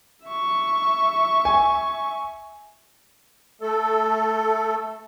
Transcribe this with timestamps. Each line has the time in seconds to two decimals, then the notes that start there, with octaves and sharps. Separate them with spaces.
0.24 E5 C#6
1.45 G#5
3.61 A3 A4